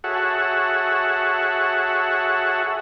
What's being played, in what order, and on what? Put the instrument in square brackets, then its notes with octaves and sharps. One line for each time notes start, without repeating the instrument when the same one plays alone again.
[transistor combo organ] F#4 G#4 A4 C#5 E5 F#5